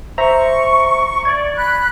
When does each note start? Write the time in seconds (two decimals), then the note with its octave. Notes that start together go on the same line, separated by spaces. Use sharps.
0.18 C5 E5 A#5 C#6
1.25 D5 G#6
1.56 B5 F#6